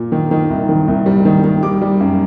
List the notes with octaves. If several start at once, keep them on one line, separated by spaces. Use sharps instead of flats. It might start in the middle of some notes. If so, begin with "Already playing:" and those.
Already playing: A#2
D#3
D#3
C2
D#3
C2
G3
D#3
D#3
G3 D6
G3
F#2